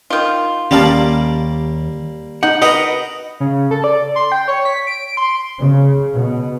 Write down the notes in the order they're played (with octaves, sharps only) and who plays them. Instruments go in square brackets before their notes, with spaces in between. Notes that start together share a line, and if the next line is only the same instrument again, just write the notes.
[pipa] D#3 F4
[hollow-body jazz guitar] D#2 [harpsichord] G3 A#3 D5 [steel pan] C#4 F5 A5
[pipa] D#4 [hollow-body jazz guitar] F#5
[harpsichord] F#4 A#4 B4 [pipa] D#5 [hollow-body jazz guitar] F#5
[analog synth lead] C#3
A4
D5
C6
G5
C#5
B6
D7
C6
[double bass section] C#3
B2